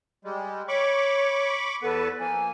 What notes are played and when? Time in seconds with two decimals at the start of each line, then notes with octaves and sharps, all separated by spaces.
0.25 G3 G#3
0.68 C#5 B5 C#6 D6
1.82 E2 B3 A4 B4
2.20 F3 A#3 G#5